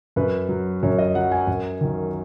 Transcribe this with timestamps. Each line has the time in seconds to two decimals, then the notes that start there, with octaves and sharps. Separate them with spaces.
0.16 F#2 B4
0.49 F#3
0.83 F#2 C#5
0.98 D#5
1.15 F#3 F#5
1.32 G#5
1.47 F#2
1.81 D#3 F#3